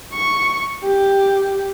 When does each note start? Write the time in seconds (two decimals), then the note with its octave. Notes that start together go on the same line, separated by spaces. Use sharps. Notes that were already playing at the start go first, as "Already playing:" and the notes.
0.13 C#6
0.84 G4